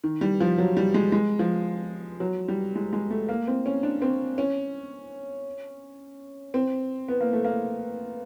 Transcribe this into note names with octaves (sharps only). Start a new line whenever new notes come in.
D#3
G3
F3
F#3
G3
G#3
G#3
F3
F#3
G3
G#3
G#3
A3
A#3
C4
C#4
D4
C4
C#4
C4
B3
A#3
A3
A#3